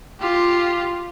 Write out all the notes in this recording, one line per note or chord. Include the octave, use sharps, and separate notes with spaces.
F4 G4